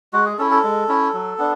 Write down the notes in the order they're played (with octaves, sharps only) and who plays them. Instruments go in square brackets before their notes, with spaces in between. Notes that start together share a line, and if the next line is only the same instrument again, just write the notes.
[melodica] G#3 F#4
G#4
C#4 E4 A4
A4
G#3
C#4 E4
F#3
B3 D4